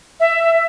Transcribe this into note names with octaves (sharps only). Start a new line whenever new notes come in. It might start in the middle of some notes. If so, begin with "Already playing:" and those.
E5